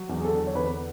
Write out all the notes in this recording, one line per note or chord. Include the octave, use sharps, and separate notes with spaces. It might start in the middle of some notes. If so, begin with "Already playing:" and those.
Already playing: F#3
E2
G#4
A4
D3
C#5
E2 B4